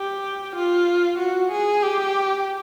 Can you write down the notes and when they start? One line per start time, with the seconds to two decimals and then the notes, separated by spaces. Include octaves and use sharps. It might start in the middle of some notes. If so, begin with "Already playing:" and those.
Already playing: G4
0.56 F4
1.19 F#4
1.52 G#4
1.83 G4